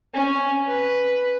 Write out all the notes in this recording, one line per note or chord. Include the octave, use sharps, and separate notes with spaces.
C#4
B4